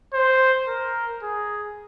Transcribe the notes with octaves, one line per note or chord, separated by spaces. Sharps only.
C5
A#4
G#4